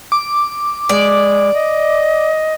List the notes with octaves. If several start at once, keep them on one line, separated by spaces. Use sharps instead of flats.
D6
G#3 D5
D#5